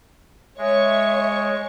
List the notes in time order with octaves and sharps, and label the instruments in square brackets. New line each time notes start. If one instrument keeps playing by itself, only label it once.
[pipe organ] G#3 [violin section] C#5 C#6 [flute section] E5